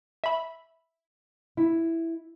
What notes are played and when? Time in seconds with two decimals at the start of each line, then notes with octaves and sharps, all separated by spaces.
0.24 E5 B5
1.57 E4